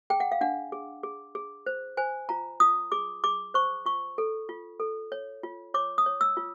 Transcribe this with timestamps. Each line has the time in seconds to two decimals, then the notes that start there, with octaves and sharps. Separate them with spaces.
0.10 G#4 G5
0.20 F#5
0.32 F5
0.41 D4 F#5
0.72 G#4
1.03 G#4
1.35 G#4
1.66 C5
1.97 C5 G#5
2.29 F4 A#5
2.60 F4 D#6
2.92 G#4 D6
3.24 G#4 D6
3.54 C5 C#6
3.86 F4 C#6
4.18 A4
4.49 F4
4.80 A4
5.12 C#5
5.43 F4
5.74 C#5 D6
5.98 D#6
6.06 C#5
6.21 E6
6.37 F4